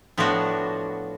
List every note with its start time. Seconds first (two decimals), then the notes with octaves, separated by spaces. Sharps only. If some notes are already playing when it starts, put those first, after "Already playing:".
0.18 A2 F3 B3 D4 F#4